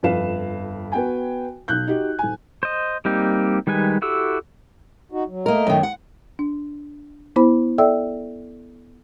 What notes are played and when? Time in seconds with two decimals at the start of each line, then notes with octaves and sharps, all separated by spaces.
0.03 G1 F2 B4 F5 E7
0.92 B3 F#4 G5 G#5
1.68 B1 F#6 G6
1.87 D#4 F#4 G4
2.19 D#1 G#5
2.63 C5 D#5
3.05 G3 A#3 C4 D#4 G4
3.67 D#3 G3 G#3 B4 G#5
4.02 E4 F#4 G4 A4 E6
5.12 D#4 F#4
5.28 F#3
5.46 A3 A#3 A#4 D#5
5.67 F#2 D#3
5.83 F#5
6.39 D4
7.36 B3 E4 C5 B5
7.78 A4 D5 E5 G5 E6